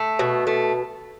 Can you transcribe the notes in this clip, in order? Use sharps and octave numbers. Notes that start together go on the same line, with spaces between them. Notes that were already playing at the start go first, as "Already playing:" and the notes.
Already playing: A3
B2
A3